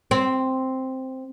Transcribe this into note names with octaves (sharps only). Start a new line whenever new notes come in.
C4